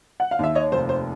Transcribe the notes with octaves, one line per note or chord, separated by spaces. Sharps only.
F#5
F5
D#2 E5
C#5 D#5
F1 C5
C5